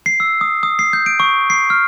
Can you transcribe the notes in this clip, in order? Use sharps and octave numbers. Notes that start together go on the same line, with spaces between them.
C7
E6
D#6
D#6
C7
G6
D7
C#6
C7
F6